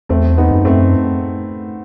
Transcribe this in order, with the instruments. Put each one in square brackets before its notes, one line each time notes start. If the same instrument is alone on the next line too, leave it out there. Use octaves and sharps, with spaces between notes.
[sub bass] E2 [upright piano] A3 C4
[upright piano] B3 D#4
[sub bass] F#2
[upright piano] A3 C4